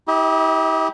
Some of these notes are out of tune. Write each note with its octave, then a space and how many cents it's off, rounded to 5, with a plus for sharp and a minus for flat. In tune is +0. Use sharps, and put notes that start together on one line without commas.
E4 -40 G4 +0 D#5 +25